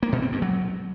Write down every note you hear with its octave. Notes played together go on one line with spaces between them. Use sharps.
A#3
B2
C4
G2
F#3